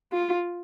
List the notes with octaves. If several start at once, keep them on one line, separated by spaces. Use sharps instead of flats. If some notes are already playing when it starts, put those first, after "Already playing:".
F4